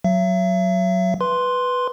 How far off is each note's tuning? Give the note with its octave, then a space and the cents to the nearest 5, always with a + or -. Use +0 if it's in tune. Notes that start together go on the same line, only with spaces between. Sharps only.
F#3 +0 E5 +40
B4 +0 C6 +0